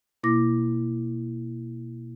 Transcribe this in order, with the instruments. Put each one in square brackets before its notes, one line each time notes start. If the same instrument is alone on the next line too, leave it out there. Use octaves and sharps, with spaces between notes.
[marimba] B2 A#3 E4 D6 A#6